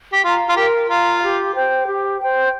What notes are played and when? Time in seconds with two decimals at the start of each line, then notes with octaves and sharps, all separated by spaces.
0.13 G4
0.24 F4 F5 A#5
0.49 F4
0.56 G4 A#4
0.89 F4 F5 A#5
1.22 G4
1.55 C5 G5
1.87 G4
2.20 C5 G5